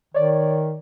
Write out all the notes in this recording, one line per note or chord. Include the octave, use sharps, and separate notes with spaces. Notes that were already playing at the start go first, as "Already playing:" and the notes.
D#3 C#5 D5